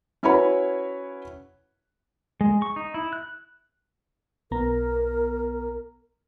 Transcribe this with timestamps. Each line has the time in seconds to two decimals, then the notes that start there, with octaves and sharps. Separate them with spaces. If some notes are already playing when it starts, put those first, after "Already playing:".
0.23 C#4 E4 F#4 B4 C#5 B5
2.41 G#3
2.62 C#6
2.76 D#4
2.94 E4
3.13 F#6
4.51 B1 B3 A#4 A#5